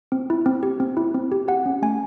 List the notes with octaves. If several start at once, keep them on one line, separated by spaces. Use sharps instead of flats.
C4
E4
C4
G4
C4
E4
C4
G4
G4 F#5
C#4
A3 G#5